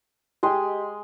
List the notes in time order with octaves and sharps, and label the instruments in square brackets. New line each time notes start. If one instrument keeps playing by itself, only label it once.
[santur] G#3 D#5 C6 [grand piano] G4 G5